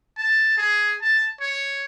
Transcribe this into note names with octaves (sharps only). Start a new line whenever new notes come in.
A5
G#4
A5
C#5